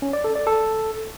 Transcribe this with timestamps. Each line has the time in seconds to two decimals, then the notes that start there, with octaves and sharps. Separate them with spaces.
0.02 C#4
0.13 D5
0.24 A4
0.36 D5
0.47 A4